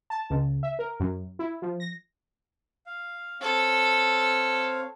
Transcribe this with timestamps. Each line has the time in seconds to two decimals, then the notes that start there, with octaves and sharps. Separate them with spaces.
0.10 A5
0.30 C#2
0.63 E5
0.79 A#4
1.00 F#2
1.39 E4
1.62 F3
1.80 A#6
2.86 F5
3.41 C4 A4 C#5 F5